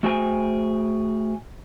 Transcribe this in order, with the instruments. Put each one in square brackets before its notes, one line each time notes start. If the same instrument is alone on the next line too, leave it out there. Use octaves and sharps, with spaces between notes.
[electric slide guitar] A3 F#4 G#4 C5 G5 G#5